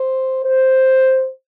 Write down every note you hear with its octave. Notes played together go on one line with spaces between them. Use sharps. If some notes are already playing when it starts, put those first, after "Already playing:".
Already playing: C5
C5